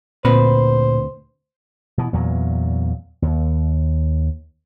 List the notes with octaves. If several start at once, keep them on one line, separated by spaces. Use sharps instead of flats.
D2 A#2 C4 B4 C5
B2 E3
E2 A#2 F#3
D#2